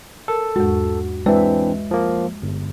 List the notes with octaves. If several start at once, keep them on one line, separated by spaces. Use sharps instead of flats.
A4 A#4
E2 G#2 G#3 F#4
E3 G#3 C4 D4 B4 E5
F3 A#3
G1